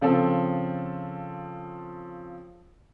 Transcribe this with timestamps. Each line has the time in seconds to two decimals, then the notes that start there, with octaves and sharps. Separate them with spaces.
0.01 C#3 F3 C4 A4